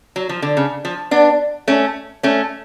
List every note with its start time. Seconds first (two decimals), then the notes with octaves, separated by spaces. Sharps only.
0.16 F#3
0.29 F3
0.42 D3
0.57 C#3
0.85 F3
1.11 B3 D4
1.68 A3 C#4
2.23 A3 C#4